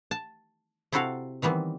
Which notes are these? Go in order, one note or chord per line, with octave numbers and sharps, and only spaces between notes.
A5
C3 C4 E4 F#4 A4 F5
D#3 E3 G3 B3 C4